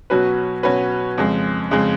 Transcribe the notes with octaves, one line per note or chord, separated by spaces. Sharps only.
B2 F#3 C#4 F#4 B4
B2 F#3 C#4 F#4 B4
F2 C#3 G#3
F2 C#3 G#3